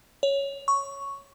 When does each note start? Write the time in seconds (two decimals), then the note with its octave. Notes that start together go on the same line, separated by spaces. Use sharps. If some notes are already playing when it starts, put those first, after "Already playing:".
0.23 C#5
0.68 C#6